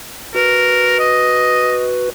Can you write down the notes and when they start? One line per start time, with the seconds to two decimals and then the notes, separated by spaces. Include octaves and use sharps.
0.35 F#4 A#4 B4
0.99 D#5